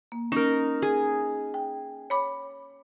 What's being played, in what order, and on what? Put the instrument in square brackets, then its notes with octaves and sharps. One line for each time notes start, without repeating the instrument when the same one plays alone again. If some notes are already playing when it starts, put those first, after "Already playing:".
[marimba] A#3
[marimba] C#4 [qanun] D#4 A#4
[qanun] G#4
[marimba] G5
C#5 B5 D6